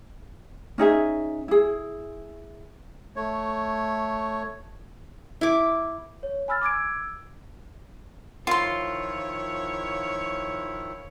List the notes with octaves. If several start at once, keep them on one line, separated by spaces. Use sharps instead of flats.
C#4 D#4 G#4 E5
E4 G#4
A3 C#5
E4 D6
C#5
G#5 B5 E6 F6 A6
D6 E6 G#6 D7
D#3 F3 E4 F4 C#5 C6